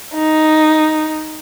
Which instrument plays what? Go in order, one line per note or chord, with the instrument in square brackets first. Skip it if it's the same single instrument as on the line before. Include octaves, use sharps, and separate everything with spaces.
[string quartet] D#4